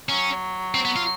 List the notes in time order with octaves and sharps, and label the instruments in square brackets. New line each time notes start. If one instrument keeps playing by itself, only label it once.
[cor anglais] F#3 [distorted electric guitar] C#4
[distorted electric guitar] C4
B3
F4